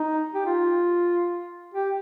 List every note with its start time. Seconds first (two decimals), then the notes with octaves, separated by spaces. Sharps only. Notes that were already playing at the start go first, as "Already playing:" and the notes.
Already playing: D#4
0.34 G4
0.46 F4
1.74 G4